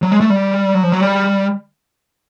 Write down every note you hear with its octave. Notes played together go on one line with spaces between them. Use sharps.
F#3
G#3
A3
G3
F#3
F3
F#3
G3